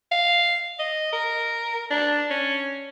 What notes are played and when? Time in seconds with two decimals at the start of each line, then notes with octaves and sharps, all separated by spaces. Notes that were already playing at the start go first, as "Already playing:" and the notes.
0.12 F5
0.79 D#5
1.13 A#4
1.91 D4
2.30 C#4